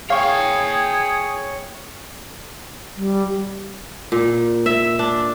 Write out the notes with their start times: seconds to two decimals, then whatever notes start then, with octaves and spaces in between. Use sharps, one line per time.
0.10 G#4 C#5 F5 G5 C#6
2.96 G3
4.12 A#2
4.66 E5
4.99 D4